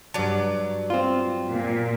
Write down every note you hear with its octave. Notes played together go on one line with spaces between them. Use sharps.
G2 F#3 D5 A5
C4 F4
A#2